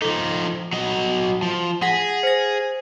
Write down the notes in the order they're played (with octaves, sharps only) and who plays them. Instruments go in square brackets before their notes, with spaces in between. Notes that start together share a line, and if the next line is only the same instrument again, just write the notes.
[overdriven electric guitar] F3 D#4 [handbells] A4
[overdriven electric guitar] F#3 D#5
F3
[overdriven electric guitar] G#4 [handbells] F#5 A#6 B6
[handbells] C5 A#6